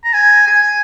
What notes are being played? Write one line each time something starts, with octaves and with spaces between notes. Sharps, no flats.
A#5
G#5
G#5